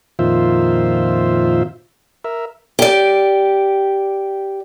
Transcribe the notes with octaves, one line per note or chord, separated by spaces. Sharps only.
F2 A#2 D#3 F4 C5 E5
A#4 E5
G4 D5